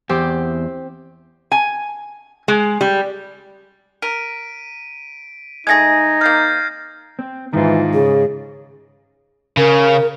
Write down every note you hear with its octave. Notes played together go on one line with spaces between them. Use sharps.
E2 C4 G4
G#5
G#3
G3
A#4 B6 D7 D#7
G#3 A3 D#4 G#4 G#6 A#6
C3 A#3 F6 G6 A6 C7
C4
G#2 D#3 E3 F4
C#3 G#4
C#3 A#4